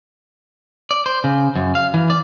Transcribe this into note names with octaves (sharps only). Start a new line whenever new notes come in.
D5
C5
C#3
F#2
F5
E3
D5